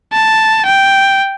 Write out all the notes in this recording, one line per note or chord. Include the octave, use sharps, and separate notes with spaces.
A5
G5